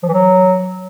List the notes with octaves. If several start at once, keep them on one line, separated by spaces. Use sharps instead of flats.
F3
E3
F#3